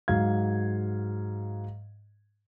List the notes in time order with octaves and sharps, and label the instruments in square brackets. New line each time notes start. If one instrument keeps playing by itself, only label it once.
[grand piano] G#2 F#3 F5 G#6